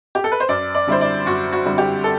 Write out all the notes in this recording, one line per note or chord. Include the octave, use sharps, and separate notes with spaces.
G4
A4
B4
C5
F#2 D5
D5
D3 G3 C4 E4 C5
D5
F#2 F#4
F#4
D3 G3 C4 E4
G4
A4